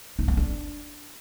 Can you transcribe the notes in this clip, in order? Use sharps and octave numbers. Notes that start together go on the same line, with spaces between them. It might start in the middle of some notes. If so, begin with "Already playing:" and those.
D#4
C#4
D4